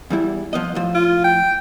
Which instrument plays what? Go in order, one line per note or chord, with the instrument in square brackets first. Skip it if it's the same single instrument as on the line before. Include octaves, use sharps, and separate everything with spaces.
[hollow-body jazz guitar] E2 G3 E4
F3 B3 D#5
A2 F3
[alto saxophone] F4
G5